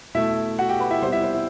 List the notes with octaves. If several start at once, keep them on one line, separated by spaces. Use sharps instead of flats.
B2 A3 E4 E5
F#4 F#5
G4 G5
B4 B5
E4 E5
C3 G3 B3 C5
E4 E5
C5
E4